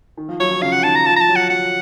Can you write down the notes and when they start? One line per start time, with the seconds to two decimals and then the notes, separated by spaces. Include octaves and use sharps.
0.17 D#3
0.29 F3
0.40 F#3 C#5
0.51 F3
0.62 C#3 F5
0.72 F#5
0.83 D#3 A5
0.95 A#5
1.06 F3 A5
1.16 F3 A5 A#5
1.29 F#3
1.36 F#5
1.50 F#3 F#5